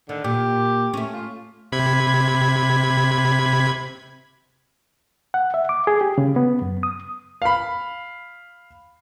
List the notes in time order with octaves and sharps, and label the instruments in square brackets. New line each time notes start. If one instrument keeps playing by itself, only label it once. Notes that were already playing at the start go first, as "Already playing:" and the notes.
[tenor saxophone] D3 [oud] D#3
[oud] A#2 [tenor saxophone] G4
[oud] A3 C#4
[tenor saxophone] F4
[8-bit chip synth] C3 B5 G#6
[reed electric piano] F#5
E5
D6
G#4
G4
C#3
B3
F#2
D#6
[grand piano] F5 B5